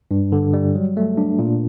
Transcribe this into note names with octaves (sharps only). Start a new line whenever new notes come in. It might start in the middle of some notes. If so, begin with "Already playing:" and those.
G2
D3
G3
F#3
A3
D4
A#2